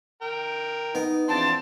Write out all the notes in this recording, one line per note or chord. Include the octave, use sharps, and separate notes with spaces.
A#4 G5
B3 D#4
E2 F3 C4 D4 A5 C6